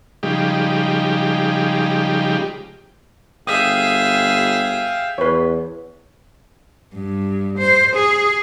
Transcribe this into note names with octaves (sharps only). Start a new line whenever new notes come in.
C#3 F3 G3 G#3 D#4 G4
G1 G#4 E5 F5 G5 D#6
E2 B4 C#5
G2
C5
G#4